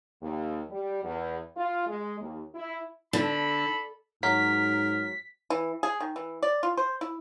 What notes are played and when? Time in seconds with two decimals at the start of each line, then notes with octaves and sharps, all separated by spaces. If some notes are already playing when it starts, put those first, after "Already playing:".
0.22 D#2
0.71 G3
1.03 E2
1.55 F4
1.87 G#3
2.19 D#2
2.54 E4
3.13 D3 A4 B5
4.23 G#2 F#3 A#4 B6
5.50 E3
5.83 G#4
6.00 D#3
6.16 E3
6.43 D5
6.63 F4
6.77 C5
7.01 E4